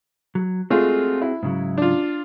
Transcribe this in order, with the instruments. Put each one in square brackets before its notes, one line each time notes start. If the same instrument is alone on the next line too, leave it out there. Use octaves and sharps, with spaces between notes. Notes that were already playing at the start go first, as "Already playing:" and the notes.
[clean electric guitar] F#3
[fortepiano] G#3 A3 F4 [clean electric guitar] C4 F#4 G#4
[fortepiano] E4
[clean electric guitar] G#2 C#3 F#3
[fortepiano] D4 F4